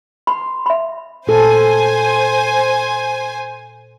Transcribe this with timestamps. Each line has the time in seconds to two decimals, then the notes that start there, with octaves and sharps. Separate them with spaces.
0.27 B5 C6
0.66 E5 B5
1.27 A#2 A4 C5 G#5